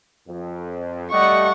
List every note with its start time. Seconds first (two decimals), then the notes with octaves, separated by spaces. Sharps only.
0.28 F2
1.12 G3 A3 D#5 F#5 C#6